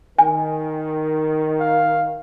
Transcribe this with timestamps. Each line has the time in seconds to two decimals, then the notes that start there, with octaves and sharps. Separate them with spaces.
0.19 D#3 G#5
1.60 F5